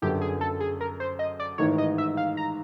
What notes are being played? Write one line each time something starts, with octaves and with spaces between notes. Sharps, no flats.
G1 F#2 D3 G4
G#4
A4
G#4
A#4
C5
D#5
D5
A1 G#2 D#3 C#5
D#5
E5
F5
A#5